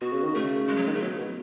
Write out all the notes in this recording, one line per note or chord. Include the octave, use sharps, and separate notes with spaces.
B2 F#4
C#3
D#3
C#3 A3
G#3
F#3
D#3 G#3
C#3 A3
B2 F#3
B2